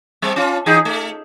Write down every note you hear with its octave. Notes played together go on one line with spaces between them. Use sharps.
G3 C4
C#4 F4
E3 D#4 G#4
A3